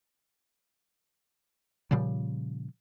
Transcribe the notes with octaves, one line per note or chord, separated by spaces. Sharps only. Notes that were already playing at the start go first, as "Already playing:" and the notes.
A#2 C#3 F3 G3